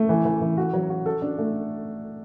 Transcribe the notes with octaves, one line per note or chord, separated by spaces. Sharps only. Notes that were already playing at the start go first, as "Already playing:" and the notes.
Already playing: A3
E3
E3
E3
F#4
F#3
F#4
A4
D4
A3